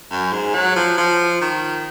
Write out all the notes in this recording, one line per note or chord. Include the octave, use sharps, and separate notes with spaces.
F#2
G#2
F#3
F3
F3
D#3